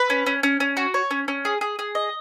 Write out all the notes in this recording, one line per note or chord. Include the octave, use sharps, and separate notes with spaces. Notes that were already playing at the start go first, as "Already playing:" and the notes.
Already playing: B4
C#4
C#4
C#4
C#4
F#4
C#5
C#4
C#4
G#4
G#4
G#4
D#5